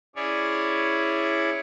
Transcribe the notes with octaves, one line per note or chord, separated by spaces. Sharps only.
C#4 E4 G#4 C#5 D5